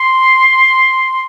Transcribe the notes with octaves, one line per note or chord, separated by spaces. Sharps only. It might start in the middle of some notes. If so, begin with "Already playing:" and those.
Already playing: C6